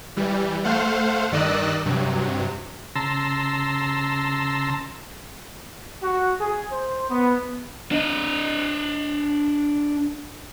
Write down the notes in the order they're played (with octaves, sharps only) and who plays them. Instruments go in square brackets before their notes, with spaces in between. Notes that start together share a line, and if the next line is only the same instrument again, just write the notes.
[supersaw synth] E3 G3
A3 C5 F5 F#5
G2 D#3 D5 D#5 E6 F#6
G2 C3 F#3
[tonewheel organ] C#3 A5 A#5 C6 E6
[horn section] F#4
G#4
C5
B3
[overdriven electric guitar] D4 D#5